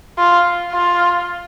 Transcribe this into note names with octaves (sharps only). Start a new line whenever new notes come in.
F4
F4